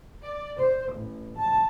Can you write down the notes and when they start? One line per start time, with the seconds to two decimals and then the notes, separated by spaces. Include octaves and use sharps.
0.24 D5
0.59 C5
0.93 A1
1.37 A5